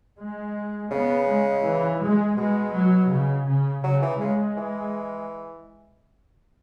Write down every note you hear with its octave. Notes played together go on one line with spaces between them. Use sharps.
G#3
C#3 B3
G#3
E3
G#3
B2 G#3
F#3
C#3
C#3
C#3 F#3
E3
C#3 G#3
E3